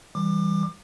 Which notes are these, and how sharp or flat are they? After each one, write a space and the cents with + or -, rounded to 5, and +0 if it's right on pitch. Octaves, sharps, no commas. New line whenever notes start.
E3 -5 G3 +0 D6 +30